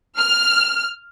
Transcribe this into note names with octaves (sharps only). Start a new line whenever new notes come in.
F6